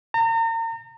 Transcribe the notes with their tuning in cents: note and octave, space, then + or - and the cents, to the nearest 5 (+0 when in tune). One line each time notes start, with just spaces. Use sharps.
A#5 -40